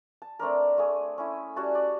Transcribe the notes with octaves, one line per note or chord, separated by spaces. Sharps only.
A5
A3 C4 D4 A#4
A3 G#4
C#4 E4
G3 C#4 F#4 A5
D5